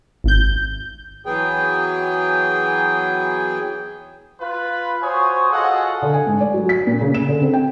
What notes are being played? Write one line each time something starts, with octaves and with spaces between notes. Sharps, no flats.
G#1 G6
E3 F#3 B3 G#4 G5
F4 B4
F#4 C5 C#5 G#5 C#6 D#6
F4 F#4 G#4 A4 D#5 F#5
D3
G#5
G#2
D5
F#3
B6
A#2
C#3
E7
D3
C4
G5